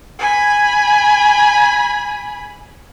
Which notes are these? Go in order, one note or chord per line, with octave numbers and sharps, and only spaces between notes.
G#5 B5